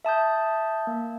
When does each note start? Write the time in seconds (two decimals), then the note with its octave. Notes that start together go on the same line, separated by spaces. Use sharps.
0.05 E5 A5 D#6 G6
0.87 A#3